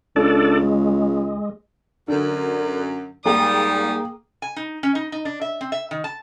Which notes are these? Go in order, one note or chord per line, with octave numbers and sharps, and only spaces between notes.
C#2 D4 A4 D5
G#3
F#2 D3 A#4
G#2 G3 A#3 G#4 D5 G5 D#6
G#5
D#4
C#4
D#4
D#4
D4
E5
C4
E5
D#3
A5